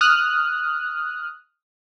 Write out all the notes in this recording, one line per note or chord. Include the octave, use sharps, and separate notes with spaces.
D#6 F6 F#6